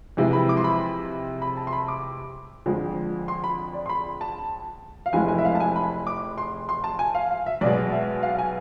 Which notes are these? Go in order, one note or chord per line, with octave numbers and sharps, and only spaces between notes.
F2 C3 E3 G#3
B5
D6
C6
B5
B5
A5
C6
B5
D6
F2 D3 F3 G#3
C6
B5
D5
C6
B5
A5
F5
F1 F2 E3 G#3 G#5
G#5
E5
F5
A5
G#5
B5
D6
C6
C6
A5
G#5
F5
F5
E5
B1 B2 G#3 D5
E5
F5
G#5